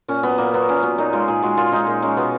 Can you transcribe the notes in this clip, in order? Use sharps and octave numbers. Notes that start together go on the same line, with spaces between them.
A#2 C#4
F#3 B3
A#2 A#3
F#3 B3
A#2 C#4
F#3 B3
A#2 D#4
G#3 F4
A#2 G#4
G#3 F#4
A#2 F4
G#3 D#4
A#2
G#3 C#4
B2 B3